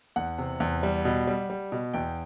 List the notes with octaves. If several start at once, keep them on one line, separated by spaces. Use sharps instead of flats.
E2 F#5
C3
E2
G3
B2
G3
G3
B2
E2 G5